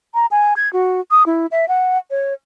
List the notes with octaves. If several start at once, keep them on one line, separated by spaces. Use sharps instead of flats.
A#5
G#5
G#6
F#4
D#6
E4
E5
F#5
C#5